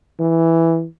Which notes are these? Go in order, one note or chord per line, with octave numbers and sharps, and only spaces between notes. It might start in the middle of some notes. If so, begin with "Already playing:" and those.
E3